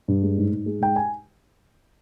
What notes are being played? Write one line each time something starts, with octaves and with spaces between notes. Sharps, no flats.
G2
G#3
G#2
G#2
G#3
G#2 G5
G#5